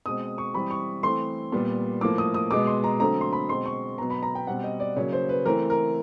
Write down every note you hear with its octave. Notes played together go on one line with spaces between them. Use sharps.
B2 G#3 C4 D#6
C#6
E3 G3 C4 B5
C#6
E3 A3 C4 C6
A#2 G3 B3
A2 F3 A#3 D6
D#6
D#6
B2 G#3 B3 D6
C6
A#5
D3 F#3 A3 C4 A#5
C6
B5
B2 G#3 C4 C6
C#6
B2 F#3 B3 A#5
B5
A#5
G5
B2 G3 C4 F#5
D#5
D5
C#3 F#3 A#3 C#5
C5
B4
E3 A3 C4 A#4
A#4